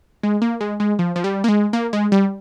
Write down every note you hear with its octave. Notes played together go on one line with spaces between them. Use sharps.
G#3
A#3
G#3
G#3
F3
F3
G3
A#3
G#3
A#3
G#3
G3